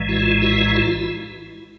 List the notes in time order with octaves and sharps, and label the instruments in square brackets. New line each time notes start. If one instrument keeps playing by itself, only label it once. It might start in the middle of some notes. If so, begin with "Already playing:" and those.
Already playing: [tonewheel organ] A#1 A2 E3 G#3
E4 F#4
F4
E4 F#4
F4
E4